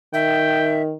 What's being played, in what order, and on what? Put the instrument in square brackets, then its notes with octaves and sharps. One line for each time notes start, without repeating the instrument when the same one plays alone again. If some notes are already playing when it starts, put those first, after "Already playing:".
[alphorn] D#3 [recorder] E5 [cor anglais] G5